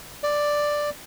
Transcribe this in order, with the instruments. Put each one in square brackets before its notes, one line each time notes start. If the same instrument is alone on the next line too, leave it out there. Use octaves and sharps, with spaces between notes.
[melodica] D5